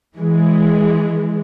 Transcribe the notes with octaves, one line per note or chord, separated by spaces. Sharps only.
E3 G#3